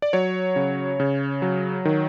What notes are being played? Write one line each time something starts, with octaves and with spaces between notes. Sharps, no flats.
D5
F#3 C#5
C#3
C#3
F#3
D#3